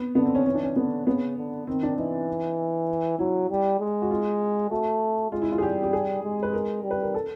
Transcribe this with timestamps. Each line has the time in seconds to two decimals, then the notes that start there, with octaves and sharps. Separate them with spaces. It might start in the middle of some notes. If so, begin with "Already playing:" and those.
Already playing: B3
0.15 D3 B3
0.26 C4
0.35 C#4
0.46 E3 C#4
0.55 D4
0.63 C#4
0.76 D3 B3
1.06 C#3 B3
1.37 D3
1.67 D#3 C4
1.83 D4
1.97 E3 D#4
3.18 F#3 E4
3.50 G3
3.80 G#3
4.02 F#4
4.11 F4
4.70 A3 F#4
5.31 G#3 F4
5.42 E4
5.52 F4
5.58 G#4
5.62 G3 G4
5.83 G4
5.93 G#4
6.24 G#3
6.43 B4
6.53 A#4
6.83 G3
6.91 B4
7.02 A#4
7.14 A4